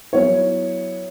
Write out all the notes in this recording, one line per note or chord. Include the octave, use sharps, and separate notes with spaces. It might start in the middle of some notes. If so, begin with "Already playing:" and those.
F#3 B3 E4 C#5